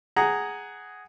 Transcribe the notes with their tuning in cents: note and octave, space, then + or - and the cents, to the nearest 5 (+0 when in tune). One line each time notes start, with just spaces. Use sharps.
G#4 +0 F#5 +10 A#5 +0